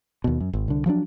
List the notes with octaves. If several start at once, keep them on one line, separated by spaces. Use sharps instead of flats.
D#2 B2
F#2
G#1
C2 D3
F3 F#3 G#3 D4